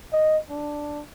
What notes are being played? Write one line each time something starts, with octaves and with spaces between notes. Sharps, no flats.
D#5
D4